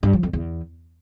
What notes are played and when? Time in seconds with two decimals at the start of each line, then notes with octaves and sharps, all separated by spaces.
0.03 G2
0.13 F3
0.23 F2
0.33 E2